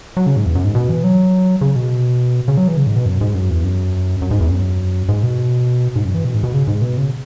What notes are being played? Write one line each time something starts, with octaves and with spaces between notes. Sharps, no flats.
F#3
C#3
G#2
E2
F#2
G#2
B2
E3
F#3
C#3
B2
C#3
F#3
E3
C#3
G#2
B2
F#2
G#2
F#2
E2
F#2
F#2
G#2
E2
F#2
G#2
B2
G#2
F#2
E3
B2
G#2
B2
C#3
G#2
B2
C#3